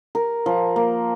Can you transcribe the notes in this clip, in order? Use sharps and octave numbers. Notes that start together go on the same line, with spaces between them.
A#4
F3
A#3